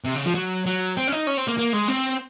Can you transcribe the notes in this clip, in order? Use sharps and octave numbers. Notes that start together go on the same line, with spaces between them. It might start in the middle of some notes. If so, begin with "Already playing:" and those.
C3
C#3
F3
F#3
F#3
C4
C#4
D#4
C#4
C4
A#3
A#3
G#3
C4